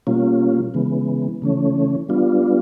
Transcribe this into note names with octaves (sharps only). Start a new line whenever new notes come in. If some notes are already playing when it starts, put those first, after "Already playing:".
B2 G3 A#3 C#4 F4
C#3 E3 G#3 B3
C#3 E3 A3 C#4
G3 B3 D4 F4